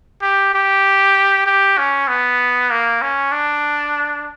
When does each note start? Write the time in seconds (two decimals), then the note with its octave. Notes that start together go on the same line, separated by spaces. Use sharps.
0.22 G4
0.54 G4
1.46 G4
1.78 C#4
2.08 B3
2.71 A#3
3.02 C#4
3.32 D4